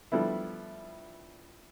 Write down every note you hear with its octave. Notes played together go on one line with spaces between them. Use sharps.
D3 F3 G3 A3 B3 E4